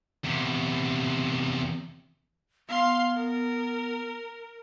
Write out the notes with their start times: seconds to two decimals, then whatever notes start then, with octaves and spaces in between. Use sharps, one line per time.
0.25 E2 C3
2.68 B3 F5 C6
3.15 A#4